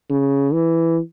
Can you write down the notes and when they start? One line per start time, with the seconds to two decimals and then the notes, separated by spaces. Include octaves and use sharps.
0.10 C#3
0.53 E3